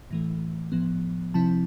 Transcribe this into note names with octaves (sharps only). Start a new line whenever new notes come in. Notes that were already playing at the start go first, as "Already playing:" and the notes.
A2 E3 A3
A2 F3 B3
C3 F3 C4 E4 A5